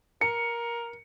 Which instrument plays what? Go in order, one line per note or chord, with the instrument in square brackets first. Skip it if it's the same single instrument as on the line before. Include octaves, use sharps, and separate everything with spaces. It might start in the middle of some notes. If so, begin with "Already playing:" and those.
[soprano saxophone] A#4 [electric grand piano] C#7